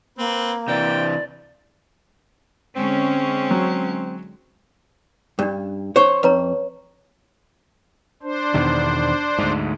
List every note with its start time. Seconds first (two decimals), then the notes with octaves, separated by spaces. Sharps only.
0.18 A#3 C4 B4
0.68 C3 E3 D5 G5
2.76 D3 G#3 C4 C#4
3.51 F#3
5.39 G2 C#4 D4
5.96 C#4 C5 C#5 C#6
6.23 F2 B4 C#5 A#5
8.23 D4 C5
8.54 E2 B2 D#3
9.39 D2 G#2